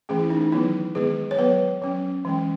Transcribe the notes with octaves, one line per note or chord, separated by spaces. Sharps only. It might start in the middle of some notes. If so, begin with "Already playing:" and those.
E3 A3 C#4 G#4
E4
D#4
D#4
D#3 F#3 B3 E4
D#3 G#3 B3 G#4
C#5
F#3 B3 B4
F#3 C#4
E3 G#3 C#4